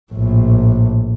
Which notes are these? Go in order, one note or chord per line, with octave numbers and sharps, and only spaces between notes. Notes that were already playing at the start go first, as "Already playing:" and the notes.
A#1 A2